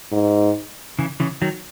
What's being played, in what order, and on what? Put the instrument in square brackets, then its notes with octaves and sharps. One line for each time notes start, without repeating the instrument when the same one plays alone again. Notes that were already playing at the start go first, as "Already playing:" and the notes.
[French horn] G#2
[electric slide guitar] C#3 E3
C#3 E3
D#3 F#3